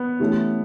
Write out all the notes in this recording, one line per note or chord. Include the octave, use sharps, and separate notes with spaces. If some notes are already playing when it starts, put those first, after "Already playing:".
Already playing: B3
E3 A3 C#4 E4 G4